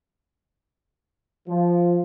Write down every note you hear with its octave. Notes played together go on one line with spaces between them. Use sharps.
F3